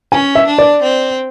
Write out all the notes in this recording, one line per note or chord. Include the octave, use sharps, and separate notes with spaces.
C#4 G#5
E5
D4
D5
C4